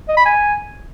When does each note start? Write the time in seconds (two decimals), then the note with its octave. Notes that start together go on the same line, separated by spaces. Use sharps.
0.08 D#5
0.17 B5
0.25 G#5